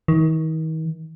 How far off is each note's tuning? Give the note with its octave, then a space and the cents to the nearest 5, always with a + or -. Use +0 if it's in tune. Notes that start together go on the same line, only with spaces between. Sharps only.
D#3 +40